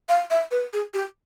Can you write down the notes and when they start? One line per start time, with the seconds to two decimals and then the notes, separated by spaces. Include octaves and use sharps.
0.08 F5
0.30 E5
0.51 B4
0.73 G#4
0.94 G4